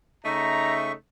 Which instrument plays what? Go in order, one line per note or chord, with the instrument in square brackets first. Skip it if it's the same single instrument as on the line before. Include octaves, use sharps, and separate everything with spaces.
[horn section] C#3 A3 D#4 [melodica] E5 C#6 [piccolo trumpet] A#5